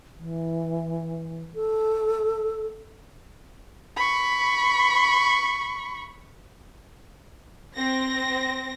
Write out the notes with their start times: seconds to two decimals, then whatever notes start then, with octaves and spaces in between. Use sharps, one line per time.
0.18 E3
1.54 A4
3.97 B5 C#6
7.75 C4 A#6